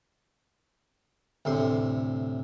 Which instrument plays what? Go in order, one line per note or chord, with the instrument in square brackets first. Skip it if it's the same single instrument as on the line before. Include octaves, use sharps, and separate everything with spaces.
[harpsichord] D2 A2 C3 C6